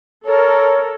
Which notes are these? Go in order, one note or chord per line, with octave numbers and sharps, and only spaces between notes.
A4 A#4 C#5